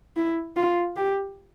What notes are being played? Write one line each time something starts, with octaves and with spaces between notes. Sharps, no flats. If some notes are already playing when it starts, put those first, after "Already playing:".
E4
F4
G4